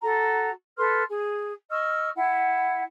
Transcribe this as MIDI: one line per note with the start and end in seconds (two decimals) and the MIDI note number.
0.01 0.49 66
0.01 0.49 69
0.01 0.49 82
0.77 1.02 69
0.77 1.02 71
0.77 1.02 84
0.77 1.02 89
1.08 1.51 68
1.70 2.09 75
1.70 2.09 85
1.70 2.09 88
1.70 2.09 89
2.15 2.81 64
2.15 2.81 78